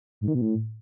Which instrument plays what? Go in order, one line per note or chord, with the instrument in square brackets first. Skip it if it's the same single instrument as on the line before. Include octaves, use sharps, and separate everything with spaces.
[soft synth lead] G#2
D#3
B2
A2